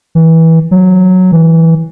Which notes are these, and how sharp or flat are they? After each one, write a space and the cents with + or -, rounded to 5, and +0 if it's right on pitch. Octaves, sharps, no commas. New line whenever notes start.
E3 -20
F#3 -5
E3 -10